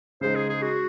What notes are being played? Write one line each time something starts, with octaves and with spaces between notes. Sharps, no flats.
C#3 G#3 D#4 C5
G#4
G#4
F#4